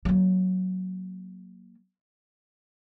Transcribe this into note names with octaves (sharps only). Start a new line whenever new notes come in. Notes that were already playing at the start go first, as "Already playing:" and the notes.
F#3 A#3